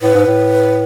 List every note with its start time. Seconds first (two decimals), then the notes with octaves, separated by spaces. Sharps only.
0.02 A2 B4
0.15 G#2
0.27 A2